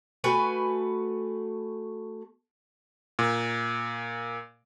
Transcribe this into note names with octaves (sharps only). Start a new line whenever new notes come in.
A3 F#4 B4 G#5
A#2